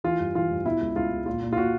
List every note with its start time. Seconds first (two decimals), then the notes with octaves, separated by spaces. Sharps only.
0.04 E3 F4
0.20 G2
0.35 E3 F4
0.50 G2
0.66 B2 E4
0.81 C#2
0.96 C#2 F4
1.12 C#2
1.26 A#2 F4
1.42 A#2
1.53 F4
1.57 A#2 F#4